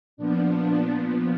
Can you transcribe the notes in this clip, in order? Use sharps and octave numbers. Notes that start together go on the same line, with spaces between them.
A#2 F3 B3 D4